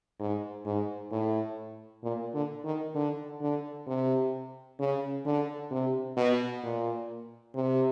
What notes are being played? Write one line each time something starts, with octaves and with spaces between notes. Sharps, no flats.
G#2
G#2
A2
A#2
D3
D#3
D3
D3
C3
C#3
D3
C3
B2
A#2
C3